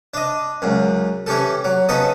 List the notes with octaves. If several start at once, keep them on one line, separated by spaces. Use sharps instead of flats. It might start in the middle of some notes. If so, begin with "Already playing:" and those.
D4 D#5
C#2 F#2
E3 C#4 G4 A4
F#3
C#3 B3 D#4 A4 D#6